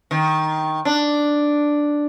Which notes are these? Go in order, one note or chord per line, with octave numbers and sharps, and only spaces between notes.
D#3
D4